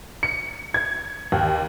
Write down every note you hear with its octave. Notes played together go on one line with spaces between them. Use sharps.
C#7
G#6
D#2